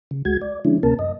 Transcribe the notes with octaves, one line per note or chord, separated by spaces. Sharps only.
C#3
D2 G#3 F#4 G#6
D5
D3 F3 G#3 C#4 D4 E4
D2 C3 A#3 C#4 A#4 A5
F#2 D#5